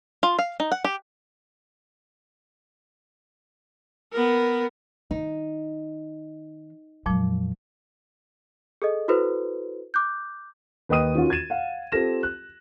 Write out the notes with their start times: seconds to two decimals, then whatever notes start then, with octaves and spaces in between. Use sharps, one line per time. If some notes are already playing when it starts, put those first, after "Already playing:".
0.23 F4
0.39 F5
0.60 D#4
0.72 F#5
0.84 G4
4.12 B3 A#4
5.11 D#3 D#4
7.06 F2 A#2 F3 F#3 G#3
8.82 G#4 A4 D#5
9.08 E4 F#4 A4 B4 C5
9.94 D6 F#6 G6
10.89 D#2 B4 D#5 G5 D#6 D#7
11.15 D#3 C#4 F4 F#4
11.30 G#6 A6 D#7 E7
11.50 F5 F#5
11.92 C4 F4 G4 A4 A#6 E7
12.23 F#6